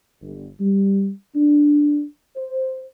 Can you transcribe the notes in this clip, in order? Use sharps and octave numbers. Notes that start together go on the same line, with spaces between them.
G1
G3
D4
C5